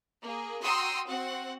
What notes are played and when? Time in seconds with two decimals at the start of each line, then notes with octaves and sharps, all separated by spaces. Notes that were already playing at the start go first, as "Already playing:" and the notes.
0.23 A#3 G#4
0.62 F#4 G5 A#5 C6 D#6 E6
1.06 C4 F#4 F#5